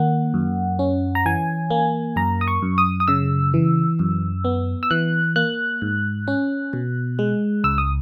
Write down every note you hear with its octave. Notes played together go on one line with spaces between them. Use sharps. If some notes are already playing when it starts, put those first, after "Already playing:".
Already playing: D#3 A#3 F#5
F#2
C#4
A#5
E3 G#5
A#3
F#2 A#5
D#6
C#6
F#2
D#6
D#6
C#3 E6
E3
F#2
B3
E6
E3 F#6
A#3 F#6
G#2
C#4
B2
G#3
C#2 E6
D#6